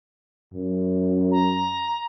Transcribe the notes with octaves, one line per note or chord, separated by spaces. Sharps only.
F#2
A#5